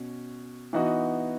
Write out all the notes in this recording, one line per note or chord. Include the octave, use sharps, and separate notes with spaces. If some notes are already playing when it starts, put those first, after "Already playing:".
Already playing: B2 C#4
E3 B3 D#4 F#4